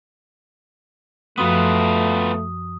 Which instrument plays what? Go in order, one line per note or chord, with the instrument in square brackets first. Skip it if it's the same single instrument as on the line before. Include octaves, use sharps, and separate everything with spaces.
[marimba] F#2 F3 C6 [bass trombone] A3 [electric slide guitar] B3 F4 [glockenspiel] D#6